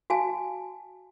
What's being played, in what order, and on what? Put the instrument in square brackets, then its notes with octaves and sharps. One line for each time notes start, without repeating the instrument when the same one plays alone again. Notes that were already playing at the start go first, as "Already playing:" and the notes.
[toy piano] F#4 F5 G#5 A5